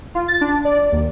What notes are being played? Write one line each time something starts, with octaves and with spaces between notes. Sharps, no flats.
F4
A6
D4
D5
D#2